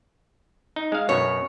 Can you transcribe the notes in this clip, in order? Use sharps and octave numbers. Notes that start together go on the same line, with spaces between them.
D#4
G#3 F5
F#2 B2 C#5